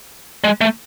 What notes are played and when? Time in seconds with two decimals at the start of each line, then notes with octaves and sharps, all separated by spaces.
0.44 G#3
0.61 A3